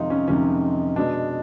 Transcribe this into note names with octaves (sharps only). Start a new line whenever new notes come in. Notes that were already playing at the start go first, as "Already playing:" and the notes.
Already playing: F2 C3 D#3 G#3 D#4 F4
C#4
F2 C3 D#3 G#3 C#4
B2 G#3 D4